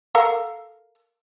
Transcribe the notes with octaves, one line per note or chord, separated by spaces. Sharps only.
A4 A#4 F5